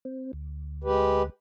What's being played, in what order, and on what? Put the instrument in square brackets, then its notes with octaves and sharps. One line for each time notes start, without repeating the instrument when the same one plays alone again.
[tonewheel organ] C4
D2
[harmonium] G#3 G4 B4